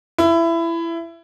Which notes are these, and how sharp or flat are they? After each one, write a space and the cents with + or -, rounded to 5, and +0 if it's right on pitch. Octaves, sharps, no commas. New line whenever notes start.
E4 +20